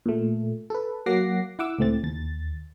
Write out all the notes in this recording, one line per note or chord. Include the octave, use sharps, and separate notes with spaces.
A#2 A3
A4 B4
F#3 A#3 F#5 D6 A#6 C7
E4 F#5 D6 E6
C#2 A2 A3 C4 A6
D#2 A6